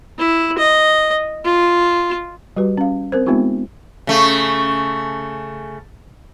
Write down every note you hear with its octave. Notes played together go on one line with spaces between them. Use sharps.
E4
D#5
F4
G3 F#4 G4 B4
C#4 F5
C4 A#4 C5
G#3 B3 C4 D#4 F4 G4
C#3 A3